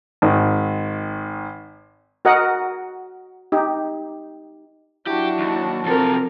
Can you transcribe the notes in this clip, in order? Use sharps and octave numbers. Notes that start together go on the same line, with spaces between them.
G#1 D#3
F#4 A#4 D#5 F#5
D#4 G4
F#3 D4 E4 F#4 G4
D#2
C2 F3 C4 A4 A#4